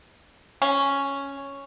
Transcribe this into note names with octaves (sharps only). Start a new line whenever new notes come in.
C#4